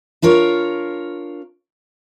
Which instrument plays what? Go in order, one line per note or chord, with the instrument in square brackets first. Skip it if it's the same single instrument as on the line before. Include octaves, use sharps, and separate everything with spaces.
[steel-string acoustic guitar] D4 F4 A#4 C#5